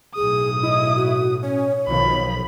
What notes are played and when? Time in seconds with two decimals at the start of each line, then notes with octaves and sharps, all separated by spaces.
0.16 B1 A2 G#4 D#6
0.63 E4 D#5
0.96 F#4
1.43 C#4 C#5
1.87 B1 B2 D#3 F3 B5